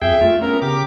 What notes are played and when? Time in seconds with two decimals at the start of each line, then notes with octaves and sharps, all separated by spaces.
0.02 F2 G#4 E5 G5
0.21 A3 F4
0.41 B3 C#4 A#4
0.62 C#3 G4 D6